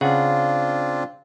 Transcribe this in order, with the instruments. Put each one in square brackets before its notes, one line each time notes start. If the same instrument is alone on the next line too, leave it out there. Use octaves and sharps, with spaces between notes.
[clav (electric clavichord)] C#3 F#5 G#5 [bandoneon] C4 D4 F4 [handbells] F5